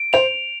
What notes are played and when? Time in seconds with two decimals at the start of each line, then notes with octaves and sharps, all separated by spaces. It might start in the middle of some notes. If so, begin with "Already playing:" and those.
Already playing: D7
0.13 C5 F7